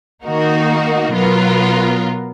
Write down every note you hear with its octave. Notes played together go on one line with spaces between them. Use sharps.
D#3 A#3 D#4 F#4 A#4
B2 F#3 B3 F4 A#4